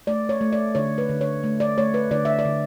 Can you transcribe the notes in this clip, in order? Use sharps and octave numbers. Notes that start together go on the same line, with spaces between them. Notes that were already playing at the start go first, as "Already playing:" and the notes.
A3 D5
C#5
A3
D5
D3 C#5
B4
D3
C#5
A3
D5
A3 C#5
B4
D3 D5
E5
D5
D3